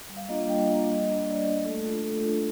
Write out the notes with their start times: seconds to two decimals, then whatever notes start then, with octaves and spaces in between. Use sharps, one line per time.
0.09 G3
0.17 F5
0.29 A#3 D4 F4 D#5
0.48 G3 G5
0.68 A#3 D4 F4 F5
0.88 G3 D#5
1.07 A#3 D4
1.26 G3 D5
1.46 A#3 D4
1.65 A3 A4
1.85 D4 F4
2.04 A3 A4
2.24 D4 F4